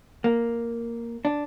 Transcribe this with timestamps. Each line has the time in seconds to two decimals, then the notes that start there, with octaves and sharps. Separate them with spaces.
0.24 A#3
1.25 D4